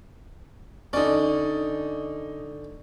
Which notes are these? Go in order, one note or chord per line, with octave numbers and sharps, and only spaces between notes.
D3 C#4 D#4 D5